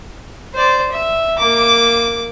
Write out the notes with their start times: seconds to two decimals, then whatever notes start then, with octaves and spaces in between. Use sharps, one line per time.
0.54 C5 D5
0.91 E5
1.38 A#3 D6